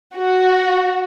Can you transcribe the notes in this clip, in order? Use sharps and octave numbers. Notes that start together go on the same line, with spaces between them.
F#4